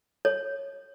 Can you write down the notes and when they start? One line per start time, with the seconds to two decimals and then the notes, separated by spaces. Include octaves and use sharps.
0.25 C#5